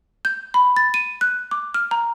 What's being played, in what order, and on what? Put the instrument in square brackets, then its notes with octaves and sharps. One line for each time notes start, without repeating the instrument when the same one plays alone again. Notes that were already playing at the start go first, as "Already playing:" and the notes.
[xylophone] G6
B5
A6
D#7
F#6
D6
F6
A#5